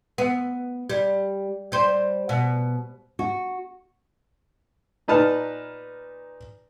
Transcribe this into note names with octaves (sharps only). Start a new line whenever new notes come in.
B3
G3
G3 C5
B2
F#4
A#2 D#4 B4 A5 F6